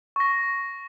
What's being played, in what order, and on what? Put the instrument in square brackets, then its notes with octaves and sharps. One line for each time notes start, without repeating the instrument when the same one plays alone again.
[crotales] C#6 A#6